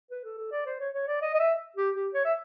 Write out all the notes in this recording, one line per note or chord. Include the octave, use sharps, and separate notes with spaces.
B4
A4
A4
D5
C5
C#5
C#5
D5
D#5
D#5
E5
G4
G4
C#5
E5